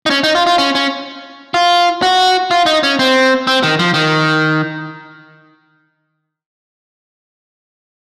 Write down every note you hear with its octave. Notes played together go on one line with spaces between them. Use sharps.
D#4
C#4
D#4
F4
F4
C#4
C#4
F4
F#4
F4
D#4
C#4
C4
C4
D#3
F3
D#3